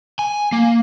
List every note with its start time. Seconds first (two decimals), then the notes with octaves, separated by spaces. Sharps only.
0.19 G#5
0.52 A#3